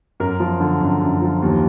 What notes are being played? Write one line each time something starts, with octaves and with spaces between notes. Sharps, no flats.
F#2 A#4
F3
D3
F#2
F#2
F3
D#2